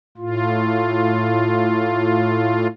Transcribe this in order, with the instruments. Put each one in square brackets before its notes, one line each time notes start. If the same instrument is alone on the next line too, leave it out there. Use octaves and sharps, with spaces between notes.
[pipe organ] A2 F4